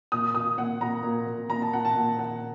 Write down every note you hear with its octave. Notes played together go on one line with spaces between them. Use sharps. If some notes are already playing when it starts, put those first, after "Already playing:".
A#2 D#6
A#2 D#6
A#2 F#5
A#2 A#5
A#2
A#2
A#2 A#5
A5
A#2 F#5
A5
A#2
A#2 F#5